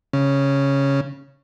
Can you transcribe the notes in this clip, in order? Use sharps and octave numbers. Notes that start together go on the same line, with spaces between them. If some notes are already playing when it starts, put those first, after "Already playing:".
C#3